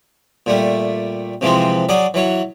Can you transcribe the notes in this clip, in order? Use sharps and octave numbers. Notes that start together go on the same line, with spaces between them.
A#2 G3 A3
C3 E3 F3 G#3 C4
F#3 G#4 D5
E3 F#3 C#5